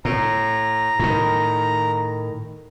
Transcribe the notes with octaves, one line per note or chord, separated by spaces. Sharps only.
A2 A#5
A2 D#3